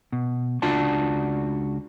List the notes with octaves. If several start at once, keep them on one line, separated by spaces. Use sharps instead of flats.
B2
C#2 D4 F4 F#4 D5 A5